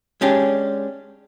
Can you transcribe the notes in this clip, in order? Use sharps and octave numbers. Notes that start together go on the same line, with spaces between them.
G#3 C#4 D4 G4